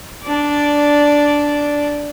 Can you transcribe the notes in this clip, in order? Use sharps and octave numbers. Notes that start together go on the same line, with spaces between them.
D4 D5